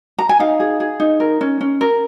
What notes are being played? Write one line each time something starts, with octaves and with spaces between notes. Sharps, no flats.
A#5
G#5
D#4 F5
G#4
G#4
D#4
A#4
C#4
C#4
A#4